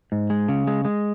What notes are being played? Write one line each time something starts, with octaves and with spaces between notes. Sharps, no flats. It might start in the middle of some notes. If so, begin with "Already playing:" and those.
G#2
G#3
C#3
G#3
G#3